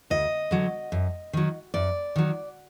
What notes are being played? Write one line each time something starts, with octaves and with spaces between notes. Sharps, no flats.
D2 D#5
D3 F#3
F#2
D#3 F#3
F#2 D5
D#3 F#3